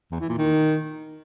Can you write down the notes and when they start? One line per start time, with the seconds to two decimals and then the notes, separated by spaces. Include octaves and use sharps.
0.12 E2
0.20 E3
0.29 A#2
0.38 D#3